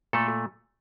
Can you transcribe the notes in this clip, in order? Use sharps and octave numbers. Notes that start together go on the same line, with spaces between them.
A#2 A3 A4